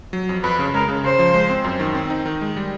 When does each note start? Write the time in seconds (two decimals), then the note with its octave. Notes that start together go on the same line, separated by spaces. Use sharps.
0.13 F#3
0.29 F2
0.43 F2 B4
0.59 C#3
0.74 G#3 A#4
0.88 C#3
1.04 C#3 C5
1.19 F3
1.34 G#3
1.50 C4
1.64 F#2
1.80 D#3
1.95 C4
2.10 D#4
2.26 D#3
2.41 G#3
2.57 G3